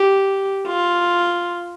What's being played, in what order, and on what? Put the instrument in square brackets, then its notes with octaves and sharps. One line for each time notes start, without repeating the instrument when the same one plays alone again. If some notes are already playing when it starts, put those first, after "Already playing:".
Already playing: [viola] G4
F4